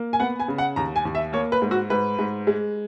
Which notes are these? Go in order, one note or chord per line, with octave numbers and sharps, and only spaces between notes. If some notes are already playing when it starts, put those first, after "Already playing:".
Already playing: A#3
G#5
B3 F#5
G#5
C#3
F#5
D#2 A#5
G#5
D#2
E5
A#3 C#5
B4
G#2
F#4
G#2 B4
G#2
G#3